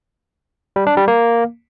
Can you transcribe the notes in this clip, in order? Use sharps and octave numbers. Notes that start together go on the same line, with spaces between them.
G3
D4
G3
A#3